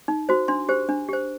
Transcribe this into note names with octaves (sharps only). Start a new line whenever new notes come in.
D#4
F#4 C5
D4 C6
G4 C5
D4
G4 C5